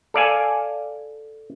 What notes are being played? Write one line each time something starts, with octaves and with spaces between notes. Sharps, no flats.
A4 D5 F5 G#5